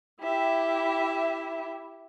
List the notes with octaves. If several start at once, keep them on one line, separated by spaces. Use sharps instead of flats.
E4 G4 E5